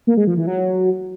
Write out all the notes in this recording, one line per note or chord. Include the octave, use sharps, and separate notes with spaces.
A#3
G#3
F3
E3
F#3